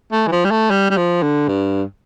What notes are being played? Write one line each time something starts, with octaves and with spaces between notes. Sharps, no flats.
A3
E3
F3
G3
A3
G3
G3
F3
D3
G2